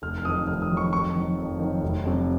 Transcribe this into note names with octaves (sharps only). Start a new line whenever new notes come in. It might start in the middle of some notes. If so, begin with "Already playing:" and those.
F1 F6
F6
F2 D#3 F#3 D#6
F1 F6
D#6
F2 D#3 F#3
C#6
F2 C#6
D#3 F#3
F2
D#3 F#3
F1
F2 C3 F#3